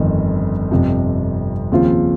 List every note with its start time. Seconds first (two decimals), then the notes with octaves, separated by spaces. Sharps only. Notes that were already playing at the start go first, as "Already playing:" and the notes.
Already playing: G1 F2 D#3
0.71 G1 F2 C3 F3
1.71 D#2 C#3 F3 C4 F4